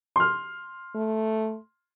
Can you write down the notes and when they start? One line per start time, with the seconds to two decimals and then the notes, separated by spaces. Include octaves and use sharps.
0.16 C6 F6
0.95 A3